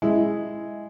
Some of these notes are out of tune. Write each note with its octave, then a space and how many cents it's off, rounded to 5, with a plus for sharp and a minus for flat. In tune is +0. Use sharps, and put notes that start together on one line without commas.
G#3 +0 E4 +0